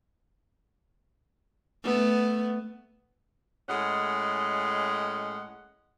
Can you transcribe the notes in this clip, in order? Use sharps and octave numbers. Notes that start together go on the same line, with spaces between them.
A3 B3
A2 G#3 C#4 D#5 F#5